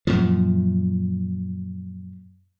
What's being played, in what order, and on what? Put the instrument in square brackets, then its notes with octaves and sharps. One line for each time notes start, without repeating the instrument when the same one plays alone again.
[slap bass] F#2 A#2 F3